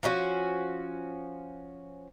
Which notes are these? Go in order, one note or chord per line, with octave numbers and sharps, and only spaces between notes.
F3 C#4 D#4 F#4